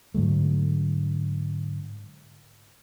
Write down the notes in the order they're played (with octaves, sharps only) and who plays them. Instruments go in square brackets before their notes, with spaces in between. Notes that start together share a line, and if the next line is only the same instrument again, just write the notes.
[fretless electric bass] G#2 D3 F#3 A3